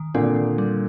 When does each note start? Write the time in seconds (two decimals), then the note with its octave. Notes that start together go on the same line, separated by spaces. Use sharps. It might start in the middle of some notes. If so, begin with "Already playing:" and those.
Already playing: D#3
0.14 A#2 D3 C4
0.36 D#3
0.58 G3